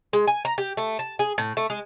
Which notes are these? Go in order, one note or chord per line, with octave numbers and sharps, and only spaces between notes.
G#3
G#5
A#5
G4
A3
A5
G#4
A2
A3
G#3